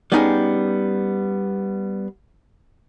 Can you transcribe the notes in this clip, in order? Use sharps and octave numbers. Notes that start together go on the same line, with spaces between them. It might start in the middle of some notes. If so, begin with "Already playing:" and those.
G3 B3 C#4 D#4 F4 G#4